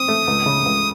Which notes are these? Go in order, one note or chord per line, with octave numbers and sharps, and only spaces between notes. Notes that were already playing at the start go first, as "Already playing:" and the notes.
Already playing: C4 D#6
A3
C#2
C#3
C#2